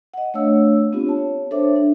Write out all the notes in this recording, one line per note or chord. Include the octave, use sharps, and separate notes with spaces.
D#5 F#5
A3 D4 C#5 F5 E6
B3 C4 D4 F4 G4
C#5 A5
D4 A4 C5 C#5 E5 D6
D4